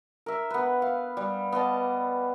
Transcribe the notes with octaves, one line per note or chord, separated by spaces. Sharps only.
A#4 E5
B3 B4
F5
G3
B3 D5 D#5 A5